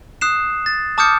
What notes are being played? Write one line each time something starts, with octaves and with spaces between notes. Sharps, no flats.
D#6 F#6 C7 E7
A6
A5 D6 D#6 F6 G6 C#7